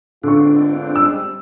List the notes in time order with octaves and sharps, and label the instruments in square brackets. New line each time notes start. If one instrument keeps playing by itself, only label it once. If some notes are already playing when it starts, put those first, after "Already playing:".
[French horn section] G#2 B2 F4 [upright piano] D3 C#6 [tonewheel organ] C4 D4
[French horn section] G3 G#3 [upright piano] E6